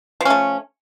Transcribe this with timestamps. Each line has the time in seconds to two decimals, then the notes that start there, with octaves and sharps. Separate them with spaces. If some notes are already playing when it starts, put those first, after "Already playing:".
0.21 F3
0.25 C#4
0.30 A3